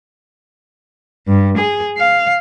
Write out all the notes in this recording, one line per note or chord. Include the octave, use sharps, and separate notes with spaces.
G2
G#4
F5